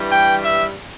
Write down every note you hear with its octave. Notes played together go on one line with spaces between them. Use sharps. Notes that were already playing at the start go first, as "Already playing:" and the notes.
Already playing: G2 E3 G3
G5
E5